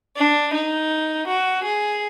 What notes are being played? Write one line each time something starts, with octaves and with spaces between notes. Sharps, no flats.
D4
D#4
F#4
G#4